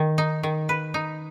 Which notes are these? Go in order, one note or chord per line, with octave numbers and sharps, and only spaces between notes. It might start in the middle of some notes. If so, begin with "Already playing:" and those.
Already playing: D#3
D#4
D#3
B4
D#4